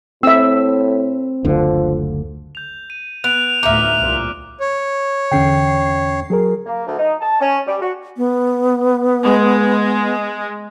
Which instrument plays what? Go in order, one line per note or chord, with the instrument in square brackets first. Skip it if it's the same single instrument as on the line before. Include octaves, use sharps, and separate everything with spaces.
[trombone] A2 [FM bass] C4 [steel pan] E5 E6
[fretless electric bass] F#1 D2 D3 [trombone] F3
[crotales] G6 F7
D#7
[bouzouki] B3 [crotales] F#6 D7 [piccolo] F7
[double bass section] D2 A2 B3 [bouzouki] D#4 F4 E5 [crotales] D6 F6
[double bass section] C2 A#2
[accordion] C#5
[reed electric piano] E2 C#4 G5 [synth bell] D3 C7
[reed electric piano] F#3 G#4 A#4
[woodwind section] A#3
D2
D#4
A5
C#4
G3
F#4
[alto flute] B3
[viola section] G#3